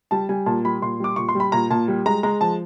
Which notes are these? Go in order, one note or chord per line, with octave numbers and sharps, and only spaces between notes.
G3 A5
G3 G#5
A#2 A5
G3 B5
A#2 C6
G3 D6
A#2 C#6
C6
G3 B5
A#2 A#5
A#2 A5
G3
G#3 A#5
G#3 A#5
F3 A5